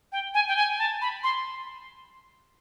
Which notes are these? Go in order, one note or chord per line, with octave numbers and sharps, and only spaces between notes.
G5
G#5
G5
G#5
G#5
A5
B5
C6